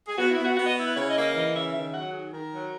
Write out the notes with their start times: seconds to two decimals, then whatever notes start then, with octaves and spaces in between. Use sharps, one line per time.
0.08 G#4
0.17 B3 F#4
0.31 E4
0.37 B3
0.43 F#4
0.56 B3 F#4
0.66 D#5
0.76 E4
0.86 B4
0.96 C#3 C#5
1.09 D#5
1.15 A#3
1.22 D#5
1.35 E3 D#5
1.54 C#3 E5
1.74 D#3 E5
1.93 F#3 F#5
2.13 D#3 G#4
2.33 D#3 A#4
2.52 F#3